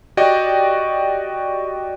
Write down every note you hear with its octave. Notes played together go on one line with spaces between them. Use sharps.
F#4 G4 D5 D#5 G5